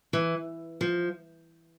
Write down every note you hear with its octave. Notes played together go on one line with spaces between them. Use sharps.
E3
F3